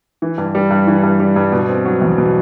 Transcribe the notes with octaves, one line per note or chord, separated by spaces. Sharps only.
E3
G2
G3
G2
E3
G2
G3
G2
B2
C4
F#3
E2
B2